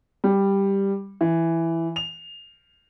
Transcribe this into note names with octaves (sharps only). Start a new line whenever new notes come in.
G3
E3
F7